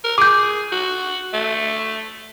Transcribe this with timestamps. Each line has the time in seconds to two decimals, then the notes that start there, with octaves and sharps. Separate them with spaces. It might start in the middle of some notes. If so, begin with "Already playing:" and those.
0.04 A#4
0.18 G#4 D6 G6
0.72 F#4
1.33 A3